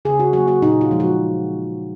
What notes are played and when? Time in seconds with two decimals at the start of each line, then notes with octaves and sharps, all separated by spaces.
0.05 C#3 G#4
0.20 F#4
0.33 F#3 A#3 F#4
0.48 F#4
0.62 A#2 D#4
0.81 F4
0.91 F3 G#3
1.00 F#4